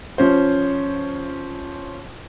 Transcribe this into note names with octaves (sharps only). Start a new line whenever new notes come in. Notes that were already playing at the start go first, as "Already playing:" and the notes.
F3 C#4 C5